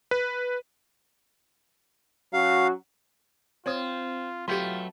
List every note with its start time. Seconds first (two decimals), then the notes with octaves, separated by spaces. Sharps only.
0.11 B4
2.33 F#3 C#4 F#4 F5
3.66 C4 F4 C5 C#5 D#6
4.48 F#3 A3 F4 G4 B4 G5 C6